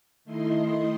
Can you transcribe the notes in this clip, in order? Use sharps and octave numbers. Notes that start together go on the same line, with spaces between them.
D#3 A3 E4 D#5 C6